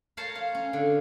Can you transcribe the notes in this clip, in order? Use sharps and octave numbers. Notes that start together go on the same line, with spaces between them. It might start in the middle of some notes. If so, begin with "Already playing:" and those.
A#4 C5 C#5 A5 C6
F5
C#4
D3